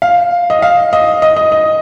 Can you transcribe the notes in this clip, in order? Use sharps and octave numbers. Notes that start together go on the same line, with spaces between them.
F5
D#5
F5
D#5
D#5
D#5
D#5